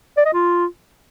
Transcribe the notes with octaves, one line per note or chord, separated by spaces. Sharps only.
D5
D#5
F4